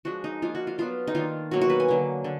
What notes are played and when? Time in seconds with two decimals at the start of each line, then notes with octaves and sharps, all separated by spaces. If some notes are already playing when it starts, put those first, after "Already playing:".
0.05 F3 G#3 D4 F#4
0.24 D#4
0.42 F3 A#3 D4 F4
0.55 F#4
0.67 F4
0.78 F#3 B3 D4 F4
1.07 D#4
1.15 D#3 A#3 D4 F4
1.51 B2 F#3 A#3 F#4
1.61 F#4
1.70 B4
1.80 G#5
1.88 D3 F#3 A#3
2.24 D3